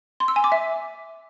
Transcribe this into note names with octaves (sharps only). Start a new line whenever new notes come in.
C6
E6
G#5
D6
E5